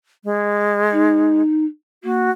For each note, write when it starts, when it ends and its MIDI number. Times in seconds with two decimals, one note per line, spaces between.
0.24 1.42 56
0.92 1.65 63
2.03 2.28 58
2.03 2.31 66